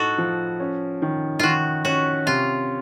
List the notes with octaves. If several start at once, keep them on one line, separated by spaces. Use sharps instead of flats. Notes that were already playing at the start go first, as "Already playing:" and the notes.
Already playing: A2 D#4 F#4 A4
F3
C#4
D#3
D#3 F4 F#4
C#4 F#4
C3 F4